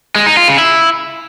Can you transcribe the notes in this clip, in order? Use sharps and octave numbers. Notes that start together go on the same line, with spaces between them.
G#3
D#4
F4
C#3
E4